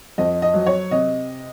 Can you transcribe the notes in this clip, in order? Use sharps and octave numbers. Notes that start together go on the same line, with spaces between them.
F2 D#5
D#5
F#3
C#5
C3 D#5